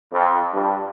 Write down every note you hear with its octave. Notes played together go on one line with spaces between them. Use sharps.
F2
G2